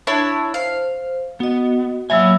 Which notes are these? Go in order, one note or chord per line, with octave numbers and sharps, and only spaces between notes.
D4 E4 C#5
C5 F5
B3 F#4 D#5
F#3 A#3 C#5 E5 G#5 B5 E6